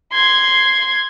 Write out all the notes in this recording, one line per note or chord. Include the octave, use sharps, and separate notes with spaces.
C6 G#6